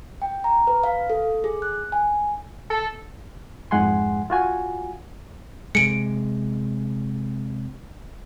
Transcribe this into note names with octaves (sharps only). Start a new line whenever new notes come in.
G5
A#5
B4
F5
A4
G#4
F#6
G#5
A4
F2 G#2 G#3 F#5 G#5 C6
F4 F#4 G#5
C3 G#3 C#7 D7